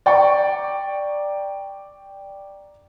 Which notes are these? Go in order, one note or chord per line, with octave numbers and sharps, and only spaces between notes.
D5 G5 A#5 C#6